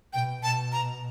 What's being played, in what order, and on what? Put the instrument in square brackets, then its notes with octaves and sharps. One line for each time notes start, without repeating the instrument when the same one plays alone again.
[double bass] B2 [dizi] G5
[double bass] B2 [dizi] A5
[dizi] A#5